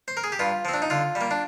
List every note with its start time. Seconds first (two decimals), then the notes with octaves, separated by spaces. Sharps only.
0.08 C5
0.17 A#4
0.24 G#4
0.32 G4
0.39 G2 F4
0.65 F3 C4
0.74 D4
0.82 D#4
0.90 D3 F4
1.15 G3
1.21 A#3
1.31 D4